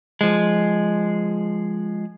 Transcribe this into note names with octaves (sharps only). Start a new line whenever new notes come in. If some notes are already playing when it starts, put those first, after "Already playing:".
F3 G#3